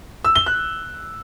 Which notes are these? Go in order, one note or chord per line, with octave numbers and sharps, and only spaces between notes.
E6
G7
F#6